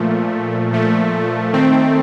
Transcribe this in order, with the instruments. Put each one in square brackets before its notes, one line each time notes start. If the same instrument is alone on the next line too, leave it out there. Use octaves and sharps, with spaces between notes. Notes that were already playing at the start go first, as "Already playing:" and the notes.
Already playing: [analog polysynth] A#2 F3 A3
A#2 F3 A3
D#3 A3 C4